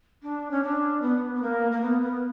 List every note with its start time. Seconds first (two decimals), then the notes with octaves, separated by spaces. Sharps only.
0.22 D4
0.50 C#4
0.63 D4
1.01 B3
1.34 B3
1.42 A#3
1.71 A#3
1.81 B3
2.02 B3